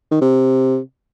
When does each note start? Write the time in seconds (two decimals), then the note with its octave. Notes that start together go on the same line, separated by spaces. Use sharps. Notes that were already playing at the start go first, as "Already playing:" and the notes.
0.11 D#3
0.21 C3